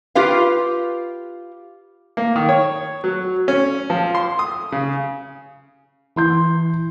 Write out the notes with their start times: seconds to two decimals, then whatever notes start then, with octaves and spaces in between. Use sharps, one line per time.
0.15 F4 G4 B4 F5
2.17 A#3
2.36 D#3
2.49 C#5
3.04 F#3
3.48 C#4
3.90 F3
4.15 C6
4.39 D#6
4.72 C#3
6.16 E3 C6 G6